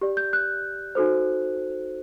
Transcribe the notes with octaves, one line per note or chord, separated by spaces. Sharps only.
G4 D5
G6
F#6
D#4 F#4 A4 C5